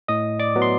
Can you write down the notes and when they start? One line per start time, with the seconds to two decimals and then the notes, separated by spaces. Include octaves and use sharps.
0.08 A2 D#5 D#6
0.40 D5 D6
0.56 F#3 B3
0.62 C6